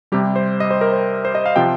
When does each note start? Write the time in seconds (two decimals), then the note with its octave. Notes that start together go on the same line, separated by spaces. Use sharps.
0.12 C3 G3 G4
0.36 C5
0.60 D#5
0.71 C5
0.81 A#4
0.92 C5
1.25 C5
1.35 D#5
1.46 F5
1.56 C3 F3 G5